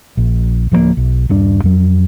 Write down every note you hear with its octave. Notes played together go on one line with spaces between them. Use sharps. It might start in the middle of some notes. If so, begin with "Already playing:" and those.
A#1
D1 F3 F#3 A#3
B1
D#1 G2 D4
F2 F#3